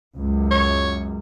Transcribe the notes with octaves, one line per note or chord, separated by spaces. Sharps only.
C#2 F#2
C#5